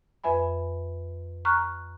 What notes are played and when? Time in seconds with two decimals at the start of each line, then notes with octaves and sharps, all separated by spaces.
0.24 F2 B4 E5 G#5 B5
1.45 A#5 C#6 F6 F#6